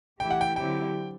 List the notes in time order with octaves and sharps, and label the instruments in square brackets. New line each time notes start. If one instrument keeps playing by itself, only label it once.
[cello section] E3 A3 E4 G4 [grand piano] G5
[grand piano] F#5
G5
[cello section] D3 F#3 C4 E4 G4 [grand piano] G5